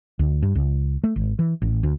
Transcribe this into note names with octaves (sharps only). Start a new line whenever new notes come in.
D2
G2
C#2
A3
G#1
E3
A1
D2